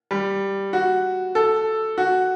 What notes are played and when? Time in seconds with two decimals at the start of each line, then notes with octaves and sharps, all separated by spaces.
0.11 G3
0.73 F#4
1.35 A4
1.98 F#4